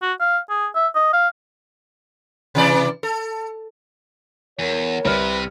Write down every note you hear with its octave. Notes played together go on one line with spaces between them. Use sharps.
F#4
F5
G#4
E5
D#5
F5
C3 E3 D5
A4
E2 A#4 C#5
C2 C3 B4 F6 C#7